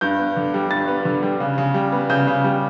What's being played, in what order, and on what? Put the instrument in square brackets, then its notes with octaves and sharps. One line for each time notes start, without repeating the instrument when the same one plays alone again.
[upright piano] G2 G6
B3
D3
G3
G2 A6
B3
D3
G3
C#3
C#3
G3
B3
C#3 G6
C#3
G3